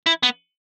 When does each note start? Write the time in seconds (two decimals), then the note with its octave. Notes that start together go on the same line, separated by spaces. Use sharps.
0.06 E4
0.23 B3